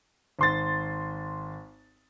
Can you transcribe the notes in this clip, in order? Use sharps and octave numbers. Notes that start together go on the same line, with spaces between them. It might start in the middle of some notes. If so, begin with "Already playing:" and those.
G#1 C6 A6